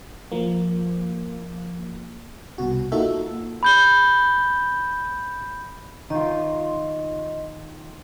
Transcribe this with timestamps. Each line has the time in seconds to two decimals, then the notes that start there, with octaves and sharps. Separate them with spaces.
0.32 F3 A#3
2.58 C2 B2 F#4
2.92 A#3 D#4 F4 F#4 A4 E5
3.63 B5 G6 G7
6.10 D#3 F4 D#5